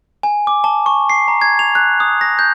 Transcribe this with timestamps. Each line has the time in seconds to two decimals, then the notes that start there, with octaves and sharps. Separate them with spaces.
0.23 G#5
0.47 D6
0.64 A5
0.86 C#6
1.10 C7
1.28 A#5
1.41 G#6
1.59 F7
1.75 F#6
2.00 D#6
2.21 A#6
2.39 G6